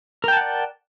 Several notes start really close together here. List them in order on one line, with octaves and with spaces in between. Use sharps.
A#4 G5 A5 F#5 D5